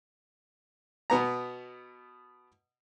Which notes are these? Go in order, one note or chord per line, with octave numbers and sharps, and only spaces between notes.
B2 B3 A#5